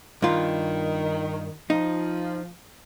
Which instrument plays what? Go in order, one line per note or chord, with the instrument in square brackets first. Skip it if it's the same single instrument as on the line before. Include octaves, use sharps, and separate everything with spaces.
[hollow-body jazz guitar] G2 F4 [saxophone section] D#3
[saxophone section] F3 [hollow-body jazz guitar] D#4